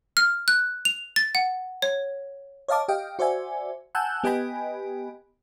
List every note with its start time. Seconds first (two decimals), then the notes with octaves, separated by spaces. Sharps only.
0.17 F6
0.48 F#6
0.85 F7
1.16 A6
1.35 F#5
1.82 C#5
2.68 C#5 D#5 F5 A5 D6
2.88 G4 D#5 F5 G5
3.19 F#4 C5 D5 E5 G#5
3.95 F#5 G#5 A5 E6 F#6 G6
4.24 B3 G4 D#5 G5 G#5 B5